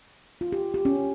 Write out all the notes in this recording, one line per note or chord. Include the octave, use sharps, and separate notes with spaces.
F4
G4
G4
C#4